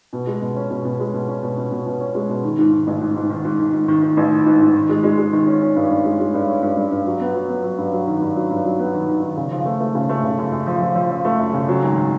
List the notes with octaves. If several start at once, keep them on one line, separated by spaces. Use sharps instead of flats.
B2
G#3
B2
C#4
B2
B2
G#3
B2
C#4
B2
B2
B2
B2
C#4
G#3
B2
D#3
G#2
D#3
A1
G#2
G#2
D#3
G#2
D#3
G#2
D#3
D#3
A1
D#3
G#2
G#2
D#3
G#3
G#3
G#3
D#3
C#4
C#4
G2
G2
G#3
G#3
G2
C#4
G2
G2
G2
F#3
B3
F#3
B3
F#3
G2
F#3
D#3
G2
F#3
G2
F#3
B3
D#3
D#3
D#3
C#3
F3
A3
A3
C#3
A3
C#3
F#2
F#2
F3
F3
F3
F3
A3
F#2
C#3
F#3
G#1
D#3